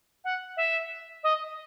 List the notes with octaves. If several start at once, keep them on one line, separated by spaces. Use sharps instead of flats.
F#5
E5
D#5